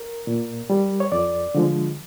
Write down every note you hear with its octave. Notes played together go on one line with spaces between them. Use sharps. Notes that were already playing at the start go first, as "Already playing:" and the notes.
Already playing: A#4
A#2
G3
C#5
F2 D5
D3 F3 G#3